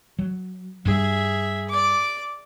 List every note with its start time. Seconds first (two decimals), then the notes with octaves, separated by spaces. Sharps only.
0.19 F#3
0.85 G2 G3 G#4 E5
1.69 D5 D6